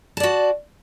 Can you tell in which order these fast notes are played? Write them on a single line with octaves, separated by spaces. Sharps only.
A5 D5 F#4